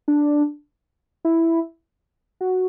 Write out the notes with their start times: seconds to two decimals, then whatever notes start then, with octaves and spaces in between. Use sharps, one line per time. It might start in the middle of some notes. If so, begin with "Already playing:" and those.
0.08 D4
1.25 E4
2.41 F#4